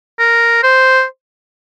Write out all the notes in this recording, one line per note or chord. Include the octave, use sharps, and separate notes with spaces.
A#4
C5